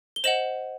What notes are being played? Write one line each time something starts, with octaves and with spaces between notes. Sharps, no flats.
G7
C5 D#5 F#5 E7 F#7